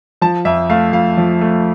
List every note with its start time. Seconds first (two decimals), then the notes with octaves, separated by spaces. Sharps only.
0.22 F3 A5
0.45 F2 E5
0.70 A3 F5
0.93 F2 F5
1.18 F3
1.41 A3